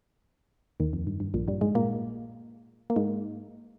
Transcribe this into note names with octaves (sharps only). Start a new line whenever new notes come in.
D#2 D#3
F2
G2
G2
A#1 A#2
G2 G3
G#2 G#3
A#2 A#3
A#3
G#2 G#3